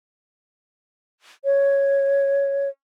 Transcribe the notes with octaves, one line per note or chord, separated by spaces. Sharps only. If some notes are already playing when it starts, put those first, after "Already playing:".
C#5